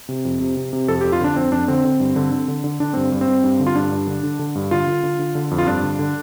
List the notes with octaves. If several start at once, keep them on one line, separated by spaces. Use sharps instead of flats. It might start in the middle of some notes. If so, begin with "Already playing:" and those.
C3
F2
C3
C3
C3
F2 A4
G4
F2
F4
D3 D4
F2 C4
F2 D4
D3 C4
D3
G2
D3
D3
D3
D3
D3 D4
G2 C4
G2
C4
G2
G2
D3
F4
G2 D4
G2
D3
D3
D3
G2
D3 F4
D3
D3
D3
D3
F2
F4
G2 D4
D3
D3